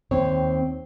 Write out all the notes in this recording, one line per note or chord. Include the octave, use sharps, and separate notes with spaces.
D#2 C4 C#5